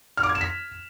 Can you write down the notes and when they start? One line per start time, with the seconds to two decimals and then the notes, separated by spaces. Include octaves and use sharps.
0.17 F6
0.23 D6
0.29 G#6
0.35 E7
0.41 B6